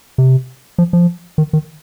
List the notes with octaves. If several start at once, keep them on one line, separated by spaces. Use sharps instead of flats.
C3
F3
F3
D#3
D#3